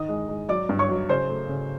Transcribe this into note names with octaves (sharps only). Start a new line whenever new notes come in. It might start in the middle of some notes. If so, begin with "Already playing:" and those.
Already playing: D#3 D#5 D#6
G#3
G#3
F#3 D5 D6
G2
C#5 C#6
F#3
C#3 C5 C6
A3
C#3